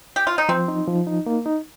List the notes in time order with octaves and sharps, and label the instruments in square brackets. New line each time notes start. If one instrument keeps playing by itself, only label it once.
[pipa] G4
F4
D#4
[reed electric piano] F3 [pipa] C4
[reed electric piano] D#4
F3
D#4
A#3
D#4